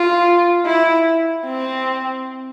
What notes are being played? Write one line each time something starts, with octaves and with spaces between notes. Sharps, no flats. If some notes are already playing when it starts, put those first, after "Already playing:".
Already playing: F4
E4
C4